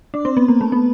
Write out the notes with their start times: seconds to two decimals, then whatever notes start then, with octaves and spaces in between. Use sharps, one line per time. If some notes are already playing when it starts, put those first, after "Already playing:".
0.14 D4
0.25 C4
0.37 B3
0.48 A#3
0.61 A3
0.72 B3